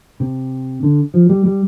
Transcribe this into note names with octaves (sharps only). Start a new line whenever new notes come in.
C3
D3
F3
G3
G3